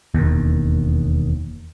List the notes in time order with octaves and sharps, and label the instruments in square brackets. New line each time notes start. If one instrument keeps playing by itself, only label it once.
[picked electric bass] E1 D#2